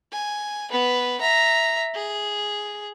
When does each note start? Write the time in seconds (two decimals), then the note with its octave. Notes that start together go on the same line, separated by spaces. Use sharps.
0.12 G#5
0.71 B3 B4
1.21 E5 A#5
1.95 G#4